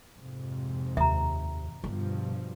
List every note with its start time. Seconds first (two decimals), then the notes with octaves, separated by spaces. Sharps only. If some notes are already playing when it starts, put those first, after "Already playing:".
0.16 F2 G#2 C3
0.97 D#2 E5 A#5
1.84 G2 B2 D3 F3 B3